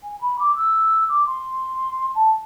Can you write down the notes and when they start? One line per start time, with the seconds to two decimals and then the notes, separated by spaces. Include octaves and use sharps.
0.03 G#5
0.21 B5
0.39 D6
0.56 E6
1.09 D6
1.27 C6
2.15 A5